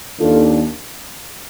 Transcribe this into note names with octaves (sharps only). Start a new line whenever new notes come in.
D#2 D#3 A#3 D4 F4 A4